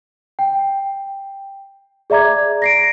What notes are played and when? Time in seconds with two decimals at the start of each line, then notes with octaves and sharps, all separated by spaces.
0.39 G5
2.10 G#4 D5 E5 A#5 D6 G#6
2.62 A#6 C7 D7